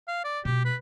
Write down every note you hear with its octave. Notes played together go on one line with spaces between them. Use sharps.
F5
D5
B2 G#3 G4
B4